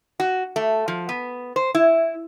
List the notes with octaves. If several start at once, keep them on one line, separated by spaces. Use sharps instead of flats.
F#4
A3
F3
B3
C5
E4